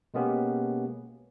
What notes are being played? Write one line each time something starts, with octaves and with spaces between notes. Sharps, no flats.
B2 G#3 A#3 B3 C#4 G4